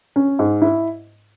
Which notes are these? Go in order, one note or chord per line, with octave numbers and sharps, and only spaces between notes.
C#4
G#2
E4